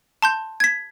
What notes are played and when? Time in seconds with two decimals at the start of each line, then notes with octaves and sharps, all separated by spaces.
0.22 A5 C6 G6
0.60 G#6 B6